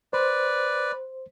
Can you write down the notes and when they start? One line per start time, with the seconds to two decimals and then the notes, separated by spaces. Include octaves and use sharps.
0.13 B4 C5 D5